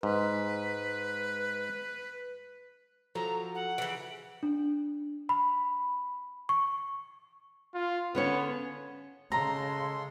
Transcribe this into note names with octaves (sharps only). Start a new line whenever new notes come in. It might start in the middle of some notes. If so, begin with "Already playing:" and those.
G#2 B4
F3 F#3 A4 A#5
F#5
C#3 E3 D7
D4
B5
C#6
F4
D3 B3 C#4 C#5
C#3 G#3 A4 A#5 C6